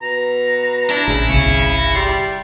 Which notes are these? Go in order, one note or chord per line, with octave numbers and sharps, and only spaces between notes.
B2 A#5
D4 E4
A1 C#3
G1 C2 C#6
F#4
G3 C6